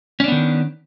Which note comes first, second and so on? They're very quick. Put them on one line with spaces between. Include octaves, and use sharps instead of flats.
C#4 D4 B3 D#3